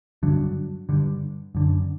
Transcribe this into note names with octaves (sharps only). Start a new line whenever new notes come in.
G2 D3 F#3
G2 D3
F#2 D3